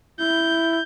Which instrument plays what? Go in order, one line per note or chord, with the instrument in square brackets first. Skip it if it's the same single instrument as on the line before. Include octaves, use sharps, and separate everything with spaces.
[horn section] E4 [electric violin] G6